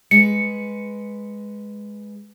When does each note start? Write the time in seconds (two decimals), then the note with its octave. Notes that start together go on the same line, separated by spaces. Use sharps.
0.11 G#3 B4 C#7